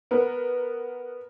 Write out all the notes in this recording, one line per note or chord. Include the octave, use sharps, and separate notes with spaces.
B3 A#4 B4